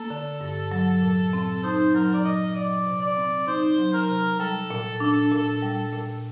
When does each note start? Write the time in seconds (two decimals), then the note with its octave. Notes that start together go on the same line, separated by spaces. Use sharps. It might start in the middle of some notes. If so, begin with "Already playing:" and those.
Already playing: A#3 A4
0.10 D3
0.41 G2
0.72 F#3
1.02 A#2
1.33 C4
1.63 D#4 C5
1.94 F#3 A#4
2.13 D5
2.24 A#2 D#5
2.55 F#3 D5
2.86 C3
3.01 D5
3.17 C4
3.47 D#4 C5
3.78 F#3
3.94 A#4
4.09 C3
4.39 G3 A4
4.70 A#2
5.00 D4
5.32 A#2
5.62 G3
5.92 A#2